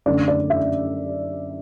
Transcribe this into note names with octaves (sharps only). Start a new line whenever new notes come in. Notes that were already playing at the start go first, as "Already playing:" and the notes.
F#2 D3 A3 D5
D5
E5